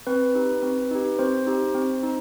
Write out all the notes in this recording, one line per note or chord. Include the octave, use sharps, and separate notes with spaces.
C4 B4
D#4 G4
C4
D#4 G4
C4 C5
D#4 G4
C4
D#4